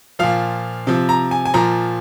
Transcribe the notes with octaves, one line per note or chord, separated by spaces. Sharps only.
A#2 F3 F5
C3 F3
A#5
G#5
G#5
A#2 F3 A#5